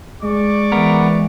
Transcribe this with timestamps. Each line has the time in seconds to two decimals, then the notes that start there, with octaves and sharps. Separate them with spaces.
0.22 G#3 D5 C#6 D6
0.72 E3 B3 A#4